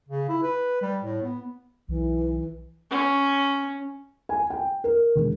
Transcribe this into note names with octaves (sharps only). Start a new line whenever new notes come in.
C#3
E4
B4
G3
A2
B3
B1 E3
C#4
G#5
G5
A#4
E1